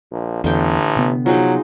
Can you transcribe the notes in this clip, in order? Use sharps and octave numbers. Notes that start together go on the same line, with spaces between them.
A#1
A1 E2 D3 G5
C3 B3
F3 F#3 G#3 D#4